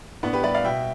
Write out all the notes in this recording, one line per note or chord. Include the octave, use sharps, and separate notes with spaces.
A2 B3 D4
G4 B4
G3 B4 D5
D5 F5
B2 E5 G5